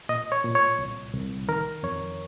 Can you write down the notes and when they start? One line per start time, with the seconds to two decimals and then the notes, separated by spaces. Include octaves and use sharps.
0.09 A#2 D#5
0.32 C#5
0.44 A#2
0.55 C#5
0.79 C2
1.14 C2
1.48 D#3 A#4
1.83 F2 C#5